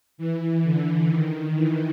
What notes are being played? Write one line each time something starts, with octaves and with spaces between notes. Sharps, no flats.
E3
D3
D#3
E3